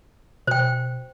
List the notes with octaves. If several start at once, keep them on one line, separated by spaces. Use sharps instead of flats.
B2 C5 G5